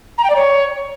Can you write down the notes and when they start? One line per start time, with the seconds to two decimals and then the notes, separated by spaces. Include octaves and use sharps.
0.18 A#5
0.24 G5
0.29 D5
0.35 C#5